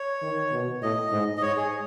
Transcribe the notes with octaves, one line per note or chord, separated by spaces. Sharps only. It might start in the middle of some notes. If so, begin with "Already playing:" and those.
Already playing: C#5
D#3
B2
A2 D#5
G#2
D#5
G#2 C#5
G#4